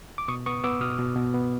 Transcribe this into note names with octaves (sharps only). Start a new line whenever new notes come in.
D6
B2 C#6 D#6
B3 C#6 D#6
B3 D6 E6
B2 D#6 F6
B2
B2
B3